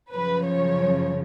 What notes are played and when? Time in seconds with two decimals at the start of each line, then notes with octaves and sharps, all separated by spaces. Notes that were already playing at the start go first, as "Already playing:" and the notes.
0.12 F#2 C#3 F3 B4
0.47 C#5